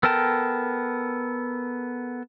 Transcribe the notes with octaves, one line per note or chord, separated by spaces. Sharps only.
B3 A4 A#4 G5 A5